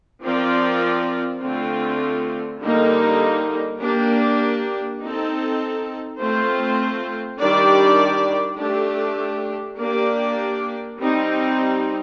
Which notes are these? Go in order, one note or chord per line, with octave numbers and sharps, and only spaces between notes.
F3 C4 F4 A#4 D5
D3 A3 C4 F4
D3 G3 A#3 D#4
A#3 D4 G4
C4 D#4 A4
A3 C4 F4 C5
D#3 G3 D4 G4 D5
A3 D4 G4
A#3 D4 G4 D5
G3 C4 D#4